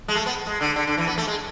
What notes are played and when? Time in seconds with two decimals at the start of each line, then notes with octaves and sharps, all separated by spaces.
0.08 G#3
0.15 A3
0.26 B3
0.47 G#3
0.61 D3
0.76 D3
0.87 D3
0.97 E3
1.07 B3
1.18 A3
1.27 G#3